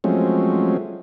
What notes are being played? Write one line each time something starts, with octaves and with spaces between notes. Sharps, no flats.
F3 F#3 G#3 A3 C4 C#4